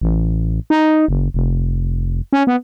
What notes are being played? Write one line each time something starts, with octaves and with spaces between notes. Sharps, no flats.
A1
D#4
F#1
F1
C#4
B3